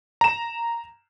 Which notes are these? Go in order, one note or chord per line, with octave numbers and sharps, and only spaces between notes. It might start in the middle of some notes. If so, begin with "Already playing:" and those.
A#5 E7